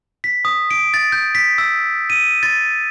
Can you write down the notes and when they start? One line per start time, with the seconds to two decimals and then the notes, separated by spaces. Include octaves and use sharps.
0.24 B6
0.45 D#6
0.71 D7
0.94 A6
1.12 G6
1.35 B6
1.58 E6
2.10 D#7
2.43 A6